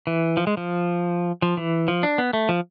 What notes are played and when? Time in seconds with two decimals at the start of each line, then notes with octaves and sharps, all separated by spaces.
0.07 E3
0.37 F3
0.47 G#3
0.57 F3
1.42 F3
1.57 E3
1.88 F3
2.03 D4
2.18 B3
2.33 A3
2.49 F3